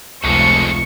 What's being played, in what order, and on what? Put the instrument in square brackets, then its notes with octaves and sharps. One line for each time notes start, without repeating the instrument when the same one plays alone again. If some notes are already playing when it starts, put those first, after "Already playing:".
[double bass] F1 [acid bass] C#2 [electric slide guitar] F3 G#3 A3 [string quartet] C#6